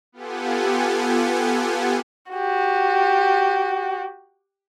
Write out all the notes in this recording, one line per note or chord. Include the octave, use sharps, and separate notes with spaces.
B3 F4 G4 A4 F#5 G#5
F#4 G4